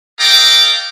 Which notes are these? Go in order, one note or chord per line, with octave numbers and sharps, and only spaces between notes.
A4 D#5 F5 G5 A#5 D6